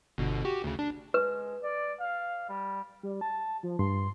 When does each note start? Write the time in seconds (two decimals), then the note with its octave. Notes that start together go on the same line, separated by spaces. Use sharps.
0.18 G1 B2 D3
0.45 F#4 G4
0.64 D2 C#3
0.79 D4
1.14 G#3 B4
1.63 D5
2.00 F5
2.49 G3
3.03 G3
3.21 A5
3.63 F3
3.79 G2 C6